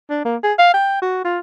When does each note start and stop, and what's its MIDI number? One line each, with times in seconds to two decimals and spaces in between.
0.10 0.21 62
0.25 0.36 58
0.43 0.53 68
0.59 0.73 77
0.74 0.99 79
1.02 1.21 66
1.25 1.39 65